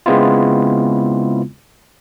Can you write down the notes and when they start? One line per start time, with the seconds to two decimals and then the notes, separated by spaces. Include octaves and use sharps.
0.06 C#3 G#3 B3 C4 E4 F4